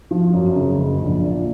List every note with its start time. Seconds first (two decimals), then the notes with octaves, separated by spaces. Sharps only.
0.11 F3
0.33 F#2
0.56 C#3
0.79 F#1
1.01 A#1
1.24 A#2